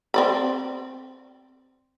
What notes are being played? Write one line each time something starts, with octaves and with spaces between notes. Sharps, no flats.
C4 D5 B5